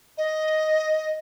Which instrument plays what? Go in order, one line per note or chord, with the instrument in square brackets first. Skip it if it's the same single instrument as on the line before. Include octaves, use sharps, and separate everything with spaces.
[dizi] D#5